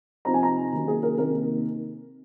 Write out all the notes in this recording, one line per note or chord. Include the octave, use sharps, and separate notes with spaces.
C3 F3 C4 D#4 A#5
G#5
A#5
C3 D#3 F#3 A#3 C#4
G#4
A#4
C3 D#3 A#3 D#4 A#4